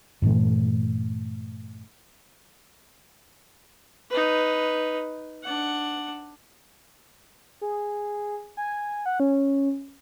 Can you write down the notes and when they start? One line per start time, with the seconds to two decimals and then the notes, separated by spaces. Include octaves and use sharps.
0.22 G2 A#2 E3 A3
4.10 D#4 B4
5.44 D4 F#5
7.61 G#4
8.57 G#5
9.06 F#5
9.20 C#4